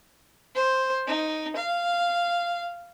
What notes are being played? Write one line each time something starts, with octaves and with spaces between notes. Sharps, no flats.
C5
D#4
F5